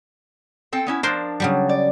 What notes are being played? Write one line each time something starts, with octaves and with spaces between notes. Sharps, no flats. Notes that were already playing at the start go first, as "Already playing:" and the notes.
C4 A4 G5
B3 C#4 E4
F3 D4 A#4 C5 C6
C#3 F#3 G3
D5